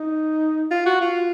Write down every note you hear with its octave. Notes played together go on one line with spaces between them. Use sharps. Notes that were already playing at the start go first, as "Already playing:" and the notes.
Already playing: D#4
F4
F#4
F4